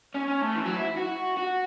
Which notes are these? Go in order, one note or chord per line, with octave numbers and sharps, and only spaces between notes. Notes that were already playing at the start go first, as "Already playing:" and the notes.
C#4
C#4
A3
E3
F#3
E4
F#4
F#4